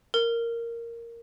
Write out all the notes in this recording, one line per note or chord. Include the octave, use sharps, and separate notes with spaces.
A#4